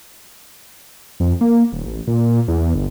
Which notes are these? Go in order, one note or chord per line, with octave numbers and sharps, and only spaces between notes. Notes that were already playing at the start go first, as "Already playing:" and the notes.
F2
A#3
D#1
A1
A#2
E2
G1